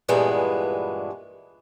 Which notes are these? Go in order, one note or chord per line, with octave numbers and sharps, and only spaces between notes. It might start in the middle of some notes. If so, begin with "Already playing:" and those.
G2 A#2 E3 G#3 B3 D4